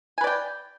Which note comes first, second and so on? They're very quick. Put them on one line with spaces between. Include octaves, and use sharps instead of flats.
G#5 B4 D5 G5